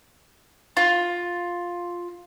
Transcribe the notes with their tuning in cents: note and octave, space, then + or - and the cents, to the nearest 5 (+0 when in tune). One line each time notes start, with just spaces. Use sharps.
F4 +5